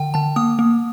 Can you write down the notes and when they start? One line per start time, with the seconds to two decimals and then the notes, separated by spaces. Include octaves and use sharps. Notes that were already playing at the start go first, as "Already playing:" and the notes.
Already playing: D3 G5
0.14 D3 A5
0.36 A#3 D#6
0.59 A#3